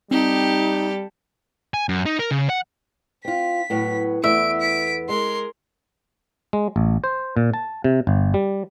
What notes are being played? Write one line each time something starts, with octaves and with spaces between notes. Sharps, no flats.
G3 C4 D#4 G4 A4
G#5
F#2
D#4
A#4
C#3
F#5
C4 F4 B6
A2 F#3 B3
E2 A3 B3 E5 D7
B6 D7
G#3 A#4 C6
G#3
A1
C5
A#2
A5
C3
G1
G3